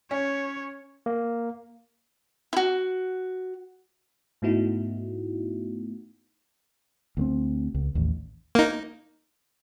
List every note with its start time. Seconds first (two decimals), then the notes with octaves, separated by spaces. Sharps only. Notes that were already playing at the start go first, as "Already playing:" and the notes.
0.11 C#4 C#5
1.06 A#3
2.53 E4 F#4
4.42 G#2 A3 B3 D#4 E4 F#4
7.17 D2 A3 C4
7.74 C#2
7.95 A1 D#2
8.55 A#3 D#4